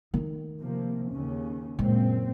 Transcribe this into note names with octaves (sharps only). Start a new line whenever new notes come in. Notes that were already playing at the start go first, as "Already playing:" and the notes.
D#3 A3
C3 F3 A#3
D#2 C#3 C#4
F#1 A#2 G#3 C4